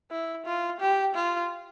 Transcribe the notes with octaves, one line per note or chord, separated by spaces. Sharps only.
E4
F4
G4
F4